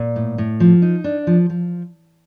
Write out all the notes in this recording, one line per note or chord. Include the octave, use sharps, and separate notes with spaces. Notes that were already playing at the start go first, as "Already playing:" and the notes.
Already playing: A#2
A2
A2
F3
D#4
D4
F3
F3